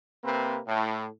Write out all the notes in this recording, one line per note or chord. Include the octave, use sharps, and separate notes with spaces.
C3 A#3 C4 B4
A2